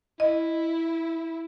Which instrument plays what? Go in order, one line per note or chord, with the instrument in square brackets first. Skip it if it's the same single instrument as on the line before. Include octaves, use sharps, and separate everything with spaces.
[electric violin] E4 [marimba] D#5